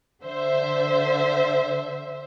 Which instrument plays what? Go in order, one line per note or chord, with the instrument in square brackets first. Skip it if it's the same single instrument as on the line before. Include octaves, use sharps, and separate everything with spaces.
[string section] D3 C5 E5